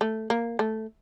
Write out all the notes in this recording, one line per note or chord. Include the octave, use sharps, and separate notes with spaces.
A3
A#3
A3